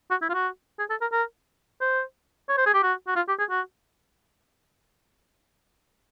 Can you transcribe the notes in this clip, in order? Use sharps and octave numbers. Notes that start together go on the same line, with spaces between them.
F#4
E4
F4
F#4
G#4
A4
A#4
A#4
C5
C#5
C5
G#4
G4
F#4
F#4
F4
G4
G#4
F#4